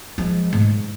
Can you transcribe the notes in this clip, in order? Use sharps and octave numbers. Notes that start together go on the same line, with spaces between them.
F3 G#3
G#2